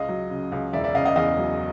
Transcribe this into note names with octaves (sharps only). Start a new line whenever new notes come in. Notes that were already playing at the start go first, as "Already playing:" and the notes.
Already playing: C#2 D#5 F5
F#3
C#3
C#2
E1 D5 E5
D5 E5
C#3 D#5 F5
D#5 F5
E2 D#5 F5
F#3